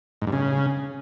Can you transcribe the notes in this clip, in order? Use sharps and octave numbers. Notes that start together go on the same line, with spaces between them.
G#2
G2
C#3